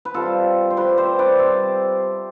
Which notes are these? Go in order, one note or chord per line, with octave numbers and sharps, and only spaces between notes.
B4
C3 G3 F4 A4
C5
C3 G3 G4 B4
C5 E5
B4 D5
C3 G3 C5 E5